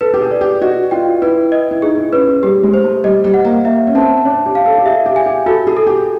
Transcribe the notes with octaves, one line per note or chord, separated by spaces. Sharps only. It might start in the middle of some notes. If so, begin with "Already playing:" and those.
A4 B4
G4
G#4
D5
G4
F#4 D#5
F4 G5
E4 B4
D#5
E4
D#4 G#4
E4
C#4 B4
C#4
G3 G4
G#3
C5
A3
G3 D#5
G3
F#5
A#3
A#3 E5
C#4
C4 A5
D4 C#5
G4
F5
A4
G4
G#4 E5
G4
G#5
G4
F#4 A4
G#4
A4
G4